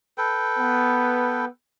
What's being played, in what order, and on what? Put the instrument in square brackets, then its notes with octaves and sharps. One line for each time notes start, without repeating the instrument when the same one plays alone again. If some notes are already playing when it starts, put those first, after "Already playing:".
[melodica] A4 B4 G5
[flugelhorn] B3